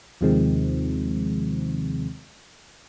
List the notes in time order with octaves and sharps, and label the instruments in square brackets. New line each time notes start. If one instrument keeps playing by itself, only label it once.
[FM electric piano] D#2 C3 D#3 F3 G#3 C4